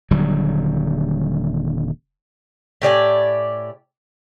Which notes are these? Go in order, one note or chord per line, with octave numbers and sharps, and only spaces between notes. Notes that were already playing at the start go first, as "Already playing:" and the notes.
D#1 D3 F#3 G3
A2 G4 D5 G#5